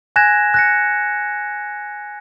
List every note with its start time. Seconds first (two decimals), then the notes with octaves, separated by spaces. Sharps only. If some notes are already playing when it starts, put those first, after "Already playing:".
0.16 G#5 F#6 G#6 A#6 E7
0.54 F#6 A#6 C#7